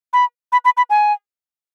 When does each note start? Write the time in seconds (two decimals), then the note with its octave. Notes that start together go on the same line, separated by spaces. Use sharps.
0.13 B5
0.52 B5
0.65 B5
0.77 B5
0.90 G#5